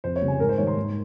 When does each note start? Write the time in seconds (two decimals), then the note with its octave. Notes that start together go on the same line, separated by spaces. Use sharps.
0.04 F2 C5
0.16 C#5
0.22 C#3 G3
0.28 G#5
0.40 G#2 A#4
0.49 C5
0.58 D#3 G3 C#5
0.67 C6
0.77 G#2